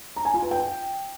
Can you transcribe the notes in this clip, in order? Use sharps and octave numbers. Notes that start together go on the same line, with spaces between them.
A#5
G#5
F4
B4
G5